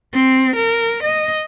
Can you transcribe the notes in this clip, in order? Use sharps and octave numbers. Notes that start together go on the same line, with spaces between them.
C4
A#4
D#5